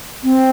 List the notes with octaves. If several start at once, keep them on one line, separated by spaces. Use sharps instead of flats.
C4